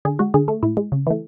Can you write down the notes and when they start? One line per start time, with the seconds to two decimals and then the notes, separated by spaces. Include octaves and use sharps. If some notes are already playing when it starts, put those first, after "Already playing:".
0.05 D3 G#4
0.19 G#3 F#4
0.34 D3 G#4
0.48 A3
0.63 A2 E4
0.77 G#3
0.92 C#3
1.07 E3 A3